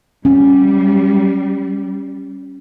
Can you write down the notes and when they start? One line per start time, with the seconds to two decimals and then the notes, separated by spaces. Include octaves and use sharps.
0.25 G3 C#4